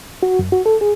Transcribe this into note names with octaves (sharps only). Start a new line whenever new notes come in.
F#4
F#2
F#4
A4
G#4